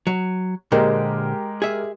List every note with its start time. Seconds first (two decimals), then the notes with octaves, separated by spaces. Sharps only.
0.07 F#3
0.72 A#2 D3 G#3 G4 A#4 C5
1.62 G#4 E5